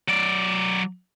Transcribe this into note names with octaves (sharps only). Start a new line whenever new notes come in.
F#3 D5